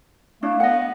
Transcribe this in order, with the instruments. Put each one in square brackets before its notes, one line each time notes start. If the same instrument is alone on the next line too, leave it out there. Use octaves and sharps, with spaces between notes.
[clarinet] A3 [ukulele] D4 E4 [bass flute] F5
[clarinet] B3 [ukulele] D#5 F#5